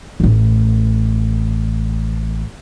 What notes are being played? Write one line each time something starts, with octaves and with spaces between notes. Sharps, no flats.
A1 A3